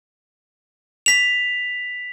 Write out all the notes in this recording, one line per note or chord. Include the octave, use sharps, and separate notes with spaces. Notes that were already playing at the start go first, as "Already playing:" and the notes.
B6 F7